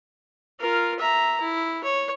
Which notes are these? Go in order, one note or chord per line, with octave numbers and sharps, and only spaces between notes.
F4 A#4
E5 A#5
E4
C#5